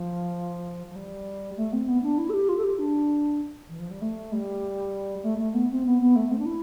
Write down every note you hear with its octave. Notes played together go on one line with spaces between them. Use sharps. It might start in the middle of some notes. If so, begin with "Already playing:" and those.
Already playing: F3
F3
G3
A3
C4
B3
D4
E4
A4
G4
F4
A4
G4
D4
E3
F3
G3
A3
G3
A3
A3
B3
C4
B3
B3
A3
C4
D4
E4